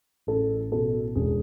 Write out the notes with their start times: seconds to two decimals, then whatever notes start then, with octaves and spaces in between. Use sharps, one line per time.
0.27 A1 A4
0.72 B2 A4
1.15 E1 G#4